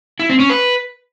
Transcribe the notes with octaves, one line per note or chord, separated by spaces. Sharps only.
E4
C4
C#4
B4